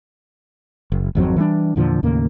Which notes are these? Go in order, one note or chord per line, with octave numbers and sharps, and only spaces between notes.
F#1
G#1 F2 F#3 C4
E3 G3 A3 D4
E2 A#2 D3 F3
D#2 A2 C#3 A#3